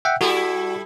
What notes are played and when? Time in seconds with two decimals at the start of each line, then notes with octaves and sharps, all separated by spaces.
0.05 E5 F#5 G5
0.21 G3 E4 F#4 A4